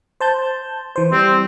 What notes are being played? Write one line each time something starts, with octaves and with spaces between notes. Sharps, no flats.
C5 A5 G6
E3 C5
G3 C4